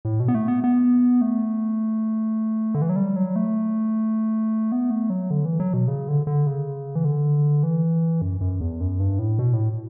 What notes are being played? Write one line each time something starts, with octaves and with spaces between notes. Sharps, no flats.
A2
B2
B3
A3
B3
B3
A3
D3
E3
F#3
G3
F#3
A3
B3
A3
F#3
D3
E3
F#3
B2
C#3
D3
D3
C#3
E3
D3
E3
F#2
F#2
E2
F#2
G2
A2
B2
A2